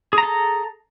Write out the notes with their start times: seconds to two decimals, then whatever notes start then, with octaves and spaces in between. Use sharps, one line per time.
0.13 G#4
0.18 A#5
0.23 A4